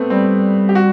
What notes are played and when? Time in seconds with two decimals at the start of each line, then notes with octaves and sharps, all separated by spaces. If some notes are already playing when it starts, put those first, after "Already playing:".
Already playing: A3 B3 C4
0.10 G3 C4
0.69 G4
0.75 F#4